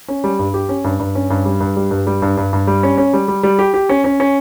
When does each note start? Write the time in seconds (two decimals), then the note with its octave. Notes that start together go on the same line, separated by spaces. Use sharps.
0.08 C#4
0.24 G3
0.39 G2
0.54 G4
0.69 C#4
0.84 G2
0.99 G2
1.15 C#4
1.30 G2
1.45 G3
1.60 G2
1.76 G3
1.91 G2
2.07 G3
2.22 G2
2.37 G2
2.53 G2
2.67 G3
2.83 C#4
2.98 C#4
3.13 G3
3.28 G3
3.43 G3
3.59 G4
3.74 G4
3.89 C#4
4.04 C#4
4.20 C#4